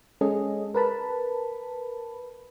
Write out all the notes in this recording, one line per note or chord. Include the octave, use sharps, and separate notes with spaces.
G#3 C#4 G#4 A4 D#5
A#4 B4 A5 B5